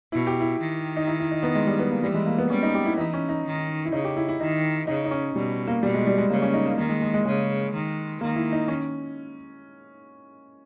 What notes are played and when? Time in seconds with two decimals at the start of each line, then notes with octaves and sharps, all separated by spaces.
0.12 B2 E4
0.27 G4
0.40 E4
0.60 D#3
0.96 D#4
1.07 E4
1.20 E4
1.31 D#4
1.43 B3
1.55 G#3
1.67 G3
1.79 B3
1.91 A#3
2.03 E3 G3
2.14 G#3
2.26 A#3
2.38 B3
2.50 G3 C#4
2.63 D#4
2.75 G4
2.85 E4
2.97 E3 D#4
3.14 C#4
3.29 D#4
3.46 D#3
3.85 E4
3.92 C#3 D#4
4.04 G4
4.17 E4
4.28 E4
4.40 D#3 D#4
4.87 C#3 D#4
5.05 D#4
5.11 C#4
5.36 B2 G3
5.67 A#3
5.82 B2 G3
5.94 G#3
6.07 G3
6.18 G#3
6.30 C#3 A#3
6.42 C#4
6.54 D#4
6.66 A#3
6.78 D#3 A#3
6.89 G#3
7.02 G#3
7.14 G#3
7.25 C#3 G#3
7.73 D#3
8.21 D#3 A#3
8.36 E4
8.52 D#4
8.68 C#4